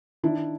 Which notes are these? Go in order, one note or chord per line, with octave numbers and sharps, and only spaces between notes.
D#3 D4 E4